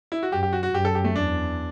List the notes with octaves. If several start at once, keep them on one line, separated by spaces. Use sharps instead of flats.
E4
F#4
F#2 G4
G4
F#4
F#4
F#2 G4
A4
G4
A3
E2 D4